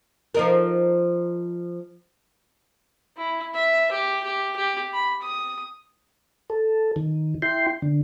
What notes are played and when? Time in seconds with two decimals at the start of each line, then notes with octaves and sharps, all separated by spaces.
0.34 F3 D#4 A#4
3.17 E4
3.55 E5
3.92 G4
4.23 G4
4.57 G4
4.93 B5
5.22 D#6
6.50 A4
6.96 D#3
7.42 E4 G5 C6
7.82 D3